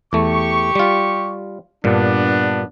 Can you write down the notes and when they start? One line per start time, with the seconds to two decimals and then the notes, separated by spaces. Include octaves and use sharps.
0.13 E2 A3 G4 C#6
0.75 G3 F4
1.84 G2 A#2 B3 D4